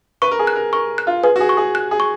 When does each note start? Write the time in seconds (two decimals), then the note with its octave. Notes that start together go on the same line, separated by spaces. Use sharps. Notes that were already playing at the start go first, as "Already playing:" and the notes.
0.22 B4 C#6
0.31 A#4
0.39 G#4
0.47 F#6
0.56 A#4
0.73 A#4 C#6
0.98 F#6
1.07 F4
1.24 G#4 B4
1.36 F#4
1.41 G#4
1.49 C#6
1.57 G#4
1.75 F#6
1.91 G#4
2.00 C#6